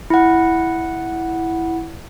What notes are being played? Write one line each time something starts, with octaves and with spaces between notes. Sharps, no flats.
E4 F#5